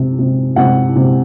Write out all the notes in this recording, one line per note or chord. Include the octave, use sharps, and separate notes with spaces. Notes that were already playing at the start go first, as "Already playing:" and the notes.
Already playing: C3
C3
C3 F#5
C3